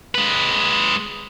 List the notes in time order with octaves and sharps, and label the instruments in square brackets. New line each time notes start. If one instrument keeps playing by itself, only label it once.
[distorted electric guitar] G#3 B4